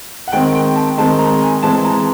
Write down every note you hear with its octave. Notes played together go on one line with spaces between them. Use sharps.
F#5
D#3 G#3 C4 G5
G5
A5
D#3 G#3 C4 A5
A#5
G#5
E3 G#3 C4 A5
A#5